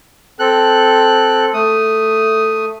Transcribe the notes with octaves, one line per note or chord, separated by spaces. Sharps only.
C4 A4 F#6
A3 D#6